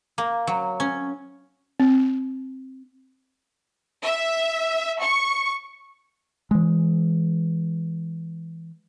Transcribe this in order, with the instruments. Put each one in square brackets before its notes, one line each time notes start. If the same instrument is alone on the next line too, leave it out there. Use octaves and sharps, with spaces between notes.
[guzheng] A#3
F#3
C#4
[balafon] C4
[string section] E5
C#6
[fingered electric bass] E3 G#3